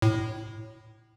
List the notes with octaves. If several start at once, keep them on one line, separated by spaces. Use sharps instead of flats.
A2